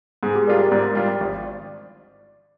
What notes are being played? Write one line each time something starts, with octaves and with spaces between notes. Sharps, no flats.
G#2 G#4
G4
G3 D4 F4 A#4
D5
G#2
G3 D4 F4
G#1